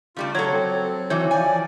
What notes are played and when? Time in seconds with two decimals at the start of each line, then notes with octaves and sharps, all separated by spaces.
0.16 C#3 G3 A3 F4
0.35 F#3 A4 C#5 A#5 C#6 G#6
0.51 C4
1.10 E3 F#4 C#5 G6
1.31 F3 D5 G#5